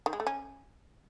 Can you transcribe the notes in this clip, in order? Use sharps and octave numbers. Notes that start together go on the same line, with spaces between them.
D#3
G#3
A3
C#4